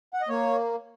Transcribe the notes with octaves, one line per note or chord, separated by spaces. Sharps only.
F#5
D#5
A#3 C#5